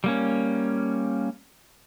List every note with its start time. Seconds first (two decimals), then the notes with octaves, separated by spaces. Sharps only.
0.04 G3 A#3 C#4